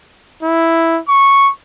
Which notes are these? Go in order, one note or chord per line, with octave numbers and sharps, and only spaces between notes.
E4
C#6